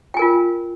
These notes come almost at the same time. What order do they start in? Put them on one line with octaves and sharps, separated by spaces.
G5 G#5 A#4 F4